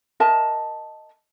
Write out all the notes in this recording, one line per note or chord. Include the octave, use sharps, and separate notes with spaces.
A#4 D#5 E5 A5